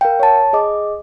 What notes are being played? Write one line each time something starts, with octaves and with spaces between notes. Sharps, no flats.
A#4 F5 G5
C#5 A5
G#4 D#5 D6